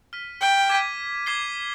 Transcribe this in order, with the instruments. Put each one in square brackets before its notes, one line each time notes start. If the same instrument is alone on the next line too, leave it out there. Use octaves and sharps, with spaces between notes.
[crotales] F6 B6 D#7
[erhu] G5
[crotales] D6 G#6 B6 D#7
D6 G#6 C7 G7